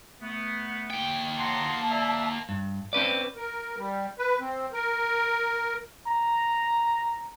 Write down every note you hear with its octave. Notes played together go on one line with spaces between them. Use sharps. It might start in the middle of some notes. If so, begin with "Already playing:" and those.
A3 B3
A#3 G5
F#5 A5 A#5 C6
D5 E5
G2
C4 C#4 B4 D5
A#4
G3
B4
C4
A#4
A#5